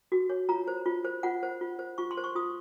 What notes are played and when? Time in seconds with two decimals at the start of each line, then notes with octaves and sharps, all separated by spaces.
0.12 F#4
0.29 C#5
0.49 F4 A#5
0.67 C5
0.86 F4
1.05 C5
1.23 F4 F#5
1.43 C5
1.61 F4
1.79 C5
1.98 F4 C#6
2.11 C6
2.17 C5
2.24 C#6
2.35 F4 D#6